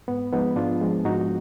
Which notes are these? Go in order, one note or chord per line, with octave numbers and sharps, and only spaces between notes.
G#2 B3
F3 G#3 B3 D#4
G#2 D4 F4
F3 G#3
G#2 D#4 F#4